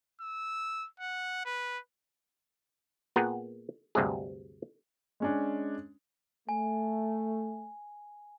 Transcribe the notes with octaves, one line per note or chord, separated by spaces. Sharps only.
E6
F#5
B4
A#2 B3 G#4 F#5 G5 A#5
D2 G2 C3 G#3 G#4
G#3 C#4 D4
A3 G#5